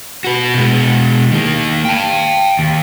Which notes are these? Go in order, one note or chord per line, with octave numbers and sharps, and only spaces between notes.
F#4 B4
B2 G#3
D#3 A#3
G5 A5
D#2